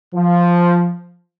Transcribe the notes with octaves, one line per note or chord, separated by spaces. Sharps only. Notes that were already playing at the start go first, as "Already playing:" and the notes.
F3